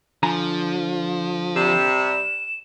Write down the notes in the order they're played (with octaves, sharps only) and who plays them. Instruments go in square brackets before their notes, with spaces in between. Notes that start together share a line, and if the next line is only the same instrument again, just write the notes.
[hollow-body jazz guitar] D3 G#5 A#5 [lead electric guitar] F3
[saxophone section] C3 G3 [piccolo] E7